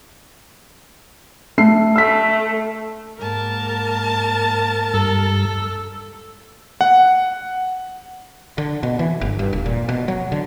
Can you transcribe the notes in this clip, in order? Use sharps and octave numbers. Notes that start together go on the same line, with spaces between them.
A3 C7
A3 E6 B6
G#2 A#3 A#4 A5
G2 A4
F#5
D3
B2
E3
G1
G2
E1
A#2
B2
F#3
D3